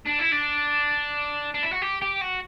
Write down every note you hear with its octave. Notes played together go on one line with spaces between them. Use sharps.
D4
E4
D4
D4
E4
F#4
G4
G4
F#4